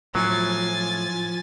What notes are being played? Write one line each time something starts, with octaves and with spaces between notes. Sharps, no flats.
A2 F3 F#3 G#5 A6